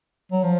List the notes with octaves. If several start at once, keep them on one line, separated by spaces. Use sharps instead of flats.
F#3
F3